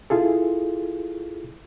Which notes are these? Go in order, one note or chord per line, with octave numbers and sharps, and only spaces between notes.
E4 F4 G#4 A4